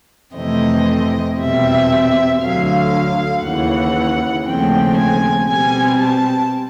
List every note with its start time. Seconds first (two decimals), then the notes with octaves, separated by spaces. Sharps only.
0.35 F2 C3 E3 A3 C4 D#5
1.38 E2 B2 G3 C4 E5
2.40 D2 D3 F#3 F5
3.42 D#2 C#3 E3 F#5
4.44 D#2 C#3 F3 A3 C4 G5
4.96 G#5
5.46 B2 G3 C4 G#5
5.97 A5